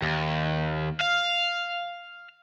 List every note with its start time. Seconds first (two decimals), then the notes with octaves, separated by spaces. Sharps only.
0.02 D#2
1.01 F5